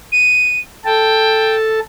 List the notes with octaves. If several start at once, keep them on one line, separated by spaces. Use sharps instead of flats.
D#7
A4 G5 A5